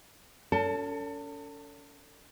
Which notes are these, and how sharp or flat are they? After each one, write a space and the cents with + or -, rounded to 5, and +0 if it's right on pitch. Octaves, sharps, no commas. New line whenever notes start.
C#4 +40 A4 +35 A5 -5